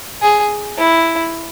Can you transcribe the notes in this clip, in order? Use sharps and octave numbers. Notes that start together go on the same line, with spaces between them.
G#4
E4